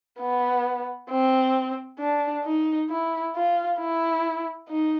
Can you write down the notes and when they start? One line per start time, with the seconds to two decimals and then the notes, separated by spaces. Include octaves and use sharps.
0.20 B3
1.10 C4
1.99 D4
2.45 D#4
2.90 E4
3.36 F4
3.79 E4
4.69 D#4